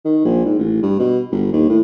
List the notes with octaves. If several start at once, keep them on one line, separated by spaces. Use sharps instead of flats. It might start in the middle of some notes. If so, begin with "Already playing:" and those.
D#3
A#1
G#2
A1
G2
B2
G1
D#2
A2